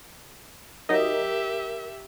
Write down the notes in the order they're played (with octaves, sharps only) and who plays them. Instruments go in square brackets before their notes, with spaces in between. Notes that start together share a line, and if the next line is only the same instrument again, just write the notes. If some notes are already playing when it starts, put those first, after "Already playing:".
[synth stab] F#3 D#4 D#5 [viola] G4 E5 [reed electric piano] A#4